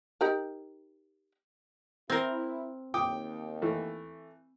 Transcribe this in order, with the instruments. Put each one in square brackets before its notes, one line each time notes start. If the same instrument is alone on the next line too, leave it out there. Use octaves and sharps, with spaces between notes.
[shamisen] D#4 G4 A#4
[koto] C4 A#4 [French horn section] E4
[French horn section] D#2 [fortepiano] G5 D6 D#6
[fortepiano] E3 A3